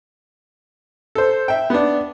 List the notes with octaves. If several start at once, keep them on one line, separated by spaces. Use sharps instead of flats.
A4 C5
E5 G5
B3 D4